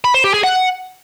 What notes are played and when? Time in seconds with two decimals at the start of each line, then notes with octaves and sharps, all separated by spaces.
0.05 B5
0.14 C5
0.24 G4
0.34 G#4
0.44 F#5